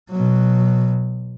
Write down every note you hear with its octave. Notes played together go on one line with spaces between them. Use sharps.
B2 F#3